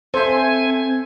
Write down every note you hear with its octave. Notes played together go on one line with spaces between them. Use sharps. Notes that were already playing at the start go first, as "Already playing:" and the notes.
C4 A4 C5 E5 G#5